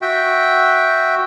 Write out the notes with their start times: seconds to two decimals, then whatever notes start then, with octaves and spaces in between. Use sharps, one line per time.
0.02 F#4 E5 G5